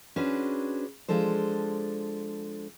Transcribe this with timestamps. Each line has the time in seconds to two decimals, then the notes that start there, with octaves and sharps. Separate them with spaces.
0.16 C#4 D4 F#4 G#4 B4 C5
1.08 F3 G#3 D4 A4 C5